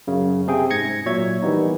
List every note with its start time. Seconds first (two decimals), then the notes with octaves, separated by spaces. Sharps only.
0.07 F#2 C#3
0.48 C3 G#4 G5
0.70 G#2 G#6 A#6 C#7
1.06 A#2 F#3 C#5 E5 G#6
1.42 D#3 E3 G3 B3 D#4